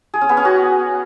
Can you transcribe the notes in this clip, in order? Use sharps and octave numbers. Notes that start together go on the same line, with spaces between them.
G#4
C#4
B3
C#4
F#4